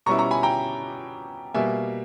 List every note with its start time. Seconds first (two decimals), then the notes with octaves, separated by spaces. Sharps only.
0.06 B2 G3 C#4 E4 A#5 C#6
0.19 A#5 C#6
0.31 G#5 B5
0.43 G5 A#5
1.54 B2 G3 A#3 E5 G#5